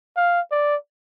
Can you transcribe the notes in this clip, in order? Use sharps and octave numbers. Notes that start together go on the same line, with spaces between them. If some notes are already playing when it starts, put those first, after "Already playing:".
F5
D5